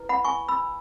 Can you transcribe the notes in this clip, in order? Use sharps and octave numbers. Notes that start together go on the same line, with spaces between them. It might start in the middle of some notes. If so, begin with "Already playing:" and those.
Already playing: E4 B4
F#5 B5
G#5 C#6
B5 E6